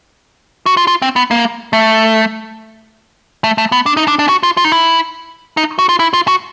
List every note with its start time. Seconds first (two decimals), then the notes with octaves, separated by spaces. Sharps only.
0.66 F#4
0.77 F4
0.87 F4
1.02 C4
1.16 B3
1.31 A#3
1.73 A3
3.44 A3
3.58 A3
3.72 B3
3.86 D4
3.97 D#4
4.08 D4
4.19 D4
4.29 F#4
4.43 F4
4.57 F4
4.64 D#4
4.72 E4
5.57 D#4
5.79 F#4
5.89 F4
5.99 E4
6.13 F4
6.28 F#4